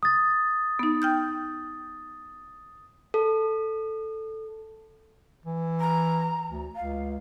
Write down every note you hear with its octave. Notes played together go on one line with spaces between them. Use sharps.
D#6 A6
B3 D#4
G5 F6 G6
A4
E3
A#5
D2
C#2 F5